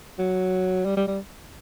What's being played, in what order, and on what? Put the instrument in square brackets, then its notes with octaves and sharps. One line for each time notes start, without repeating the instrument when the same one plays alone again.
[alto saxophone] F#3
G3
G3
G3